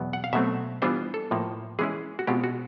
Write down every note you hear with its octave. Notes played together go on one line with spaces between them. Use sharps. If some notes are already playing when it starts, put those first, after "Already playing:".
Already playing: E2 B2 F#3 B3
F#5
F5
B2 F#3 A3 C4 E5
E3 G3 B3 D4 F4 C5
A4
A2 F3 A#3
E3 G#3 C#4 E4 G#4
F#4
B2 G#3 C4 F4 G4
F#4